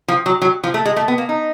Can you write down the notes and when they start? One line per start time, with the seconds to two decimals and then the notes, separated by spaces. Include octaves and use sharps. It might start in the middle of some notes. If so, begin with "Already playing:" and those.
0.08 F3
0.26 F#3
0.42 F#3
0.64 F3
0.74 A3
0.86 G#3
0.96 A3
1.08 B3
1.18 A#3
1.29 D#4